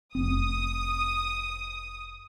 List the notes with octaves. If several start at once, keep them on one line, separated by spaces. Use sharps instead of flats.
F1 C4 D#6